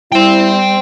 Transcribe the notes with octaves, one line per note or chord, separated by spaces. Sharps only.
G3 E4 G5 C6